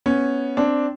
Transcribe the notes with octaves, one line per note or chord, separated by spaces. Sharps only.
B3 C#4
C4 D4